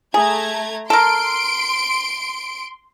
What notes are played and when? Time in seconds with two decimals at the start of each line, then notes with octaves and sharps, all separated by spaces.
0.14 A3 G#4 A#5 G#6
0.90 A4 A#4 C6 D7